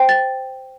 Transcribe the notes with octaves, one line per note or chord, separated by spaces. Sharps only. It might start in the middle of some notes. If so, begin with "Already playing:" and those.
Already playing: C5 G5
A6